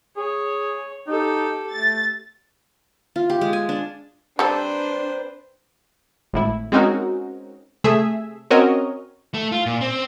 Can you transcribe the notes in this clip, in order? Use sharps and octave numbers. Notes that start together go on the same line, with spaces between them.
G#4 C#5
D#4 G4 A4
A3 A6
F4
G4
G#3
G#5
D4
G3 C4 D4 A4 B4 C5 A#5
G#1 A2 E4
G#3 C4 C#4 D#4 F#4 A#4
C3 A3 G#4 E5
C4 C#4 F#4 A#4 C#5 D#5
A3
F4
A#2
C4